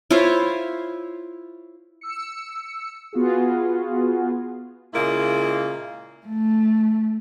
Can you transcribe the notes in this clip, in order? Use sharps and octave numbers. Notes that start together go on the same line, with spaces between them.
E4 F4 C5 C#5
E6 C#7
B3 F4 F#4 G#4
A#2 C#3 G#3 A#3 E4
A3